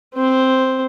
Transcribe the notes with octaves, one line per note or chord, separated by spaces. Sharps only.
C4 C5